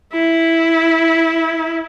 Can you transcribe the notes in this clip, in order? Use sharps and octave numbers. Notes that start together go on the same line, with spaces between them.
E4